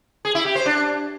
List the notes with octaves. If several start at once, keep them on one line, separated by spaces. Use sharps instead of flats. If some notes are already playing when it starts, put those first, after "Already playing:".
G#4
E4
G4
C5
D4